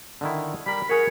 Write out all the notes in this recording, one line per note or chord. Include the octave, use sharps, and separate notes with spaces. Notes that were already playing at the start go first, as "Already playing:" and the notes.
D3 D#3 E4
G3 A#4 B5
F#4 G#4 A#4 C#5 F#5